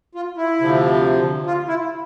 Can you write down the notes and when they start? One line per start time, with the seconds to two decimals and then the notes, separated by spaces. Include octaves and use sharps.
0.15 F4
0.37 E4
0.59 D2 C3 F3
1.46 F4
1.68 E4